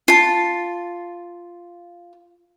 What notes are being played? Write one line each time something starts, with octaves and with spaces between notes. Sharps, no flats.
F4 A5